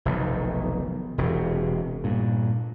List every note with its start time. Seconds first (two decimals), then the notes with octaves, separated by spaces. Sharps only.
0.05 F1 B1 D#3
1.18 E1 C3
2.04 G2 A#2